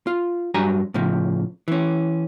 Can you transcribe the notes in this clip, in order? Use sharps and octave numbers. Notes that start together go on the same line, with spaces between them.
F4
G2 F#3 D4 G#5 A#5
A2 C#3 F3
E3 C#4